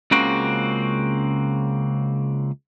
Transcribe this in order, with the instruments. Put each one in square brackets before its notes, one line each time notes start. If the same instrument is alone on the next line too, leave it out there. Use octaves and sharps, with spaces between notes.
[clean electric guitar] C#2 C#3 A#3 C4 F#4